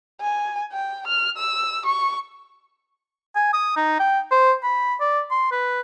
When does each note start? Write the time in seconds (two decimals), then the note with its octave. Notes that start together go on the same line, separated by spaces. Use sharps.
0.21 G#5
0.72 G5
1.07 F6
1.37 E6
1.86 C#6
3.36 G#5
3.53 D#6
3.76 D#4
4.00 G5
4.31 C5
4.63 B5
5.00 D5
5.31 C6
5.51 B4